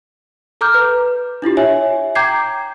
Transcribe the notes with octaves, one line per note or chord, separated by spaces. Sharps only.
A4 A#5 D6 F6 G6
B4
D4 E4 F4 G4
C#5 E5 G#5
G5 A#5 D6 G6 G#6 C7